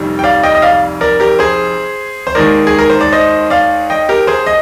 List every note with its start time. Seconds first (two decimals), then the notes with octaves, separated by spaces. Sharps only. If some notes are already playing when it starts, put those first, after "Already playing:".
Already playing: F1 F2 D#3 G3
0.19 G5
0.24 D5 F5
0.43 D#5 G5
0.55 D#5
0.62 D5 F5
1.01 A#4 D5
1.20 G4 A#4
1.39 G#4 C5
2.27 C5
2.35 D#2 D#3 G#3 A#4 D5
2.67 G#4
2.79 A#4
2.90 C5
3.01 D5
3.12 C5 D#5
3.50 D5 F5
3.90 D#5 G5
4.09 G4 A#4
4.27 G#4 C5
4.46 D#5